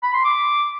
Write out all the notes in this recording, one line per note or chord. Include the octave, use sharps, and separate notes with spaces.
B5
C6
D6